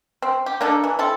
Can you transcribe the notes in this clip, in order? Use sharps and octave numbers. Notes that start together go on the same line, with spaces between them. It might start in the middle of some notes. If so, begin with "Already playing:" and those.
C4
G4
A#3 D4 D#4 A4
E3
C4 E4 A4